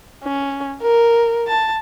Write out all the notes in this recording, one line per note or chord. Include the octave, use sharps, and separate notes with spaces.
C#4
A#4
A5